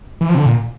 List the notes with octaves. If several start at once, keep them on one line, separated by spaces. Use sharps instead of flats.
E3
F3
C3
D3
A#2